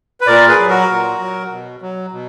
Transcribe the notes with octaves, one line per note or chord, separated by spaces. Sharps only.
B4
A#2 A#4 D5
G#4 B4
F#3
F#4 A#4
A#2
F#3
B2
F#3
B2